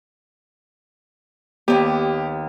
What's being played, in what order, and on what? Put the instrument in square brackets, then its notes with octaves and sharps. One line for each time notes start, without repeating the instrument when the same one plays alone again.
[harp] D#2 B3 [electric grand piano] G4